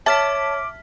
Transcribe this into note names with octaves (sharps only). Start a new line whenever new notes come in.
C#5 E5 A5 D6 F6 B6